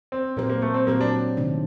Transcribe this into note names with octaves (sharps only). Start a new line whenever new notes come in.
C4
A#2 F#3 A#3 C4 G4 C5
A#3
A3
C4
A#2 F#3 A#3 C4 G4 C5
D4
C3 D#3 A3 D4